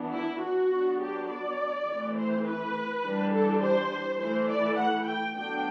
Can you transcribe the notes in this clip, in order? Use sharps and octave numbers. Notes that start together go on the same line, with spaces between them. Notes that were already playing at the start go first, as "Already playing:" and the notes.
Already playing: E3 B3 D4
E4
F#4
F#3 B3 D4
G4
D5
E3 A3 C4
C5
B4
E3 G3 D4
A4
C5
E3 A3 E4 C5
D5
F#5
G5
D3 F#3 B3 D4 G5